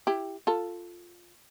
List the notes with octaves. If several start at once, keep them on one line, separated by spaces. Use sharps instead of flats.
E4 G4
F4 A4